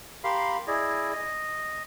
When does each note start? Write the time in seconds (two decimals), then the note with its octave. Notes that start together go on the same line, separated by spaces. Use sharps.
0.24 G4 A#4 F5 B5 C6
0.67 E4 G#4 D5 D#5
1.12 D#5